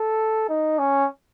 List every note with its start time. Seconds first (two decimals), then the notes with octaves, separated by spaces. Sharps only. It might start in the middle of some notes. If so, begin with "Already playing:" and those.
Already playing: A4
0.49 D#4
0.79 C#4